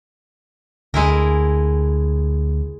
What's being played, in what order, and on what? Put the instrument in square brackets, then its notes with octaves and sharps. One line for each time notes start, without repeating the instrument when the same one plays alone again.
[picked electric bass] D2 [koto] G#3 E4 A#4